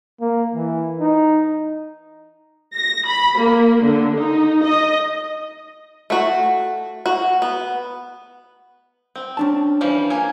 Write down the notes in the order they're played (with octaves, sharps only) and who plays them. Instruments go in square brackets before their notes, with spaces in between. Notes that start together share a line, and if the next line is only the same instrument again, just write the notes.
[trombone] A#3
E3
D#4
[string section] A#6
B5
A#3
D3
D#4
D#5
[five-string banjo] A3 F#4
F#4
B3
C4
[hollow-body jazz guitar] C#4 D4 A5
[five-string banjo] E3 F3 G3
A#3 G#5